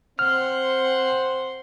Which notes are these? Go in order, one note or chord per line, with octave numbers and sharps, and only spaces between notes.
C4 C5 F#5 C6 F6